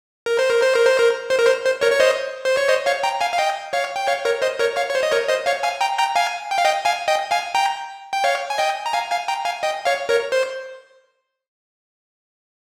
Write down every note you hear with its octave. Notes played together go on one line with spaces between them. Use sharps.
A#4
C5
A#4
C5
A#4
C5
A#4
C5
A#4
C5
C5
A#4 C#5
C#5
C5 D#5
C5
C#5
C5 D#5
C#5 F5
G5 A#5
F5 G#5
F5
D#5 G5
C#5 F5
G5
C#5 F5
A#4 C#5
C5 D#5
A#4 C#5
C#5 F5
C#5
C5
D#5
A#4 C#5
C5 D#5
C#5 F5
F5 G#5
G5 A#5
G5 A#5
F5 G#5
G5
F5
D#5 G5
F5 G#5
D#5 G5
F5 G#5
G5 A#5
G5
C#5 F5
G#5
D#5 G5
A#5
F5 G#5
F5 G#5
G5 A#5
F5 G#5
D#5 G5
C#5 F5
A#4 C#5
C5